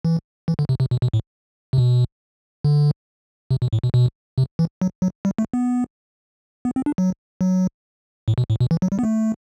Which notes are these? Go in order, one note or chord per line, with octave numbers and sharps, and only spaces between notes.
E3
E3
D3
C3
C3
B2
B2
A2
C3
B2
D3
C3
B2
A2
B2
B2
C3
E3
F#3
F#3
G3
A3
B3
B3
C4
D4
F#3
F#3
A2
B2
A2
B2
E3
F#3
G3
B3
A3